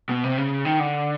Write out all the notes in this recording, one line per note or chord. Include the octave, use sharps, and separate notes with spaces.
B2
C3
C#3
D#3
D3